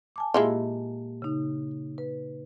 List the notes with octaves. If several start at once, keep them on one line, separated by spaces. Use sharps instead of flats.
G#5 A5 D6
A#2 G#3 A#3 E4 F4 G4
C#3 D#4
B4